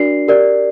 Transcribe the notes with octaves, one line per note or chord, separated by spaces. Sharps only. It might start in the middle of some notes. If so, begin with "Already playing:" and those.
Already playing: D4 F#4 A#4 D5 C7
G4 A#4 D5